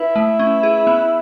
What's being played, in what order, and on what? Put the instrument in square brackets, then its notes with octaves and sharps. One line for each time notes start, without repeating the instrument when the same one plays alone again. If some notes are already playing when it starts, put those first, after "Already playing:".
Already playing: [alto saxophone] E4 [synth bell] B4
[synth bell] A3
C#4
G#4
B3